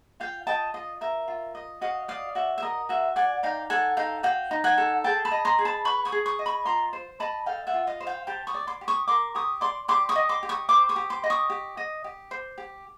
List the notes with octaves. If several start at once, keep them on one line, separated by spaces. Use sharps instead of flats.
F4 F5 G5
D#5 G5 A5
F4 D#5
A#4 E5
F4
D#5
F#4 D#5 F5
D5 D#5 F5
F#4 E5
E5
A#4 D#5
F#4 E5
D5 F#5 G#5
D#4 F5 G5
A4 F#5 G#5
D#4 F5 G5
F#4 F5 G5
D#4
F#5 G#5
A4
G#4 G5 A5
A5 B5
D#5
A#5 C6
G#4
A5 B5
B4 B5 C#6
C#6 D#6
G#4
C#6 D#6
D#5
B5 C#6
F4 A#5 C6
C5
D#5 A5 B5
A4 F5 G5
E5 F#5
F4
D#5 F5
C5
F5 G5
G4 G5 A5
C#6 D#6
D5
C6 D6
G4
C#6 D#6
A#4 C6 D6
G4 C#6 D#6
D5 C6 D6
G4 C6 D6
C#6 D#6
D#5
C6 D6
G4
C#6 D#6
C5 C6 D6
C#6 D#6
G4
C6 D6
D#5
C#6 D#6
G4
D#5
G4
C5
G4